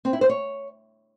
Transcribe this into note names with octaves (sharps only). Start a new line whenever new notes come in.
C4
E4
C5
C#5